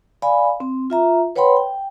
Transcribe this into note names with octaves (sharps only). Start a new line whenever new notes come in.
D5 F5 G#5 B5
C4
F4 E5 A#5
B4 C#5 F#5 G5 B5 C6
G5